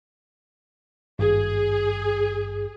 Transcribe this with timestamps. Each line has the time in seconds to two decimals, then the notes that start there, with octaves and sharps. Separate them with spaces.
1.19 G#1 G2 G#4